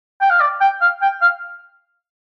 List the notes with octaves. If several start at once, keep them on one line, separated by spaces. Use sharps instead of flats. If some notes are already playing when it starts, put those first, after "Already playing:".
G5
F5
D5
G5
F5
G5
F5